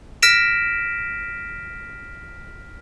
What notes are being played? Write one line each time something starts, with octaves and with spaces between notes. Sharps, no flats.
F6 A#6 B6 D7 E7